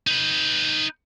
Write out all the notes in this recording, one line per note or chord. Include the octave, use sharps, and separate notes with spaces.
D#4 B4